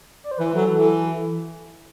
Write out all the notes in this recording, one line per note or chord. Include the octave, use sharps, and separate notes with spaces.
D5
C5
E3 B4
F#3 A4
E3